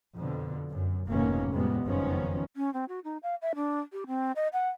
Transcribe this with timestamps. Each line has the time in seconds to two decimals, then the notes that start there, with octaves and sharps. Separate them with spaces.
0.16 F2 B2 D3
0.71 F#2
1.08 F1 G#2 B2 D#3 A#3 C#4
1.52 F2 A2 C3 G3 G#3 B3
1.86 F#1 F2 D#3 F3 B3 C#4
2.56 C#4
2.74 C4
2.89 F#4
3.04 D#4
3.23 F5
3.42 E5
3.55 D4
3.92 G4
4.07 C4
4.36 D#5
4.53 F#5